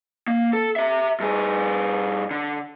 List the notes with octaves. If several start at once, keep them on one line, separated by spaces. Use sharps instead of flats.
A#3
A4
G4 E5
G2 G#4
D3